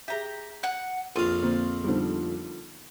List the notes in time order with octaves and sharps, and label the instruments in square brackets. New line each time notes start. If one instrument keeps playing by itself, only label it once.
[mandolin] G4 A#5 [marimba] G#4 E5
[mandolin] F#5 F#6
[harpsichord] A#1 F2 F5 [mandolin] F4
[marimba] D3 A#3 [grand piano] C4
[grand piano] D3 F3 G3 [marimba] B3 D#4 C5